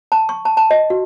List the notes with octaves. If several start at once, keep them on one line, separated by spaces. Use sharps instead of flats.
A5
C#6
A5
A5
D#5
F#4